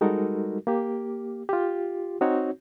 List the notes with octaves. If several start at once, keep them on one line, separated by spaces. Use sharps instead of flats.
G3 G#3 D#4 F#4 A4 A#4
A#3 G4
F4 G4
C4 D#4 F#4 C#5